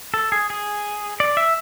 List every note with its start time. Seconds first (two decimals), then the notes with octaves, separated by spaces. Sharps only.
0.14 A4
0.32 G#4
0.50 G#4
1.20 D5
1.37 E5